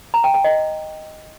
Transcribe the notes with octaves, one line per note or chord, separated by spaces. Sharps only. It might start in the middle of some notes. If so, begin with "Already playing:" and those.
A#5
G5
G5
D#5